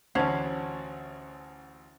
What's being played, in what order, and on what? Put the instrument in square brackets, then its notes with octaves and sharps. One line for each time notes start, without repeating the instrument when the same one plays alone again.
[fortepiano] A1 D2 [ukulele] C#4 [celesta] C5 G#6 C7 [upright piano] F#5 A5